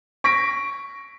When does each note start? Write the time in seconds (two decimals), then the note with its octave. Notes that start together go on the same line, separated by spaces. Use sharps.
0.24 C#6 A#6 B6 D7